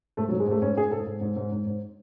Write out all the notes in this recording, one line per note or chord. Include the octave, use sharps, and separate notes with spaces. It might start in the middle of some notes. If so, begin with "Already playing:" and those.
G#2 A3
F#3
G#2
G#3
G#2 A3
G#2 C#4
G#2 G#4
G#2 A4
G#2
G#2
G#2
G#2
G#2